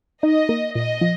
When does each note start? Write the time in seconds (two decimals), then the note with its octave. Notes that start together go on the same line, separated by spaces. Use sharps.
0.23 D#4 D#5
0.49 A#3
0.75 A#2 D#5
1.01 F3